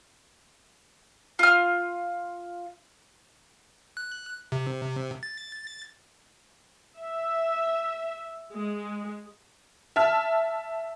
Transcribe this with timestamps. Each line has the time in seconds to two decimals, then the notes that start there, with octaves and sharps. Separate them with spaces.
1.39 F4 F6
3.97 F#6
4.52 C3
5.23 A6
6.98 E5
8.54 G#3
9.96 E5 A5 F6